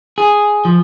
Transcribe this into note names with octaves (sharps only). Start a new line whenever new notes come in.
G#4
F3